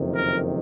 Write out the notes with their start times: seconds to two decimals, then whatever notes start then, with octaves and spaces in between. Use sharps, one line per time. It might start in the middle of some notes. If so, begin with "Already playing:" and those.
Already playing: F#1 F2 C3 D#3
0.15 A#4